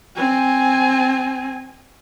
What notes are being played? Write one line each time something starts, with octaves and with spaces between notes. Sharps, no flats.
C4 G#5